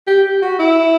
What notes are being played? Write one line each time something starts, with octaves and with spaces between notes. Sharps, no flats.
G4
G4
F#4
E4